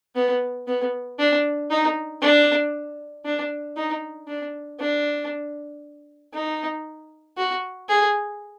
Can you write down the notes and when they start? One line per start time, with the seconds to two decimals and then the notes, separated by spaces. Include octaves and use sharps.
0.15 B3
0.67 B3
1.19 D4
1.70 D#4
2.22 D4
3.25 D4
3.76 D#4
4.28 D4
4.79 D4
6.34 D#4
7.37 F#4
7.89 G#4